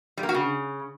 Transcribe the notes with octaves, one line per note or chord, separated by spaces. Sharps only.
G3
A#3
F#4
C#3